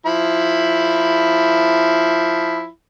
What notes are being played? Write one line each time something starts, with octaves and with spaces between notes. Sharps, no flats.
F3 E4 B5